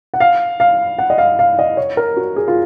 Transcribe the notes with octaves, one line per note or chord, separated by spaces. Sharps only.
F#5
F5
F5
F#5
D#5
F5
F5
D#5
C#5
A#4
F#4
G#4
F4